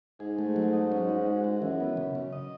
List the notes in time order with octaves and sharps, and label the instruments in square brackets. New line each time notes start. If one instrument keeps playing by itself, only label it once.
[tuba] G#2 [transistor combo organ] G#4
[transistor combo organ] A3
F#3
D#4
C#4
F#4
G#3
F#4
[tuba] F#2 [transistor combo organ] E3
[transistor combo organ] B3
C#3
C#3
D#5